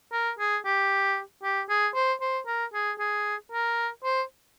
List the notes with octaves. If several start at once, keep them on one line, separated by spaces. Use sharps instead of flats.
A#4
G#4
G4
G4
G#4
C5
C5
A#4
G#4
G#4
A#4
C5